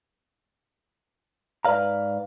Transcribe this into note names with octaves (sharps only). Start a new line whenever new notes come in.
G#2 B4 D5 F5 A#5